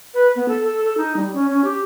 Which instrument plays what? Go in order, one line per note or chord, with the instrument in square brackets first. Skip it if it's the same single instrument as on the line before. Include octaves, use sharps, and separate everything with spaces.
[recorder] B4
B3
A4
A4
A4
D#4
G3
C#4
C#4
G4